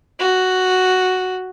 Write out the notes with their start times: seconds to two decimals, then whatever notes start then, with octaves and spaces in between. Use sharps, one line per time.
0.19 F#4